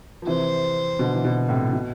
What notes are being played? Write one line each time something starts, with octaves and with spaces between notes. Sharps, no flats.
F3
C3 E3 C5
B2 D3
E3
B2 D3
A2 C3
B2